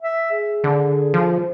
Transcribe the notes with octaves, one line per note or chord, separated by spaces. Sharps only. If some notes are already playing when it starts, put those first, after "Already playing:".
E5
G#4
D3
F3